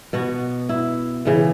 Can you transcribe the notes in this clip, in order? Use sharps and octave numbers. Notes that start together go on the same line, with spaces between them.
B2 B3 F#4
E4
C#3 E3 B3